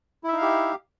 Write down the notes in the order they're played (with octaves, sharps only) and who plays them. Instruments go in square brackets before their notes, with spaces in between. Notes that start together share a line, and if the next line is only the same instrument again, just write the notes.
[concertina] E4
E5
D#4
F5
G4